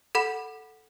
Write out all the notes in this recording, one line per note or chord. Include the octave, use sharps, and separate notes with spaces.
A4 F#5 B5